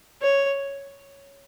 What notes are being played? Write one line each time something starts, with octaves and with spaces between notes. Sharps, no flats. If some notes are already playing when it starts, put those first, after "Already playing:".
C#5